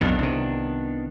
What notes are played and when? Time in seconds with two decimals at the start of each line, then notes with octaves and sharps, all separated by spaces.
0.01 B1 F2 D#3 B3 D4
0.19 C2 C3